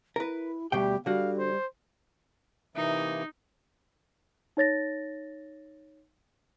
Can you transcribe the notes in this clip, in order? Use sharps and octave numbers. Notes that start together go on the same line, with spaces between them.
E4 A#4 B4
D2 B2 G3 G4 G5
D3 G3 F#4 F5
C5
C3 E3 A#3 D#4 E5
D#4 C#5 A6 A#6